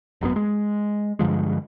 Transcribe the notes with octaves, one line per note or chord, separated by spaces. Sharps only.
G#1 F#2 B2 B3
G#3
G2 D3 F3 G#3